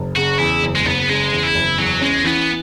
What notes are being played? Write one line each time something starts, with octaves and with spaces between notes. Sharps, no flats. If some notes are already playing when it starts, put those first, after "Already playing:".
Already playing: F#1
C#3 F#4
E2 E4
F#1
G#3
F#1 B3
C#3 G#3
E2
E4
F#1
E2 F#3
G#3 C#4
E3 B3